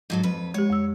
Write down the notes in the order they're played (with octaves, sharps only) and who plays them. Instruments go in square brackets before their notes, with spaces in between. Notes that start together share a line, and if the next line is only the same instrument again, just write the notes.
[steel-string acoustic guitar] G#2 F#3 A4
F2 B4
[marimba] G#3 G4 [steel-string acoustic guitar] C#5
[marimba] F2 E6